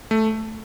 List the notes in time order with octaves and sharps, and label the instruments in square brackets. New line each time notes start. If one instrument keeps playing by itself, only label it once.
[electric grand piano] A3